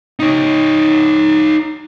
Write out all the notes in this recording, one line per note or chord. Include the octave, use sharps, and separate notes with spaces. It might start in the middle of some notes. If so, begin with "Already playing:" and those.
D#4 C#5